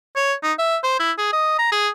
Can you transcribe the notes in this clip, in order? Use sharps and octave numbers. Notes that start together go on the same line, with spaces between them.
C#5
D#4
E5
C5
E4
G#4
D#5
A#5
G#4